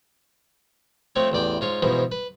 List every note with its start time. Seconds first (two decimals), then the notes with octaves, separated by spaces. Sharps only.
1.16 F3 A3 C4 C#5
1.32 A1 E2 D5 G5
1.61 G#2 F4 C#5
1.83 G#2 B2 E3 F3
2.12 B4